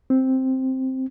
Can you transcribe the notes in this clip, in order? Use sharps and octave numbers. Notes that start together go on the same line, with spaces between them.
C4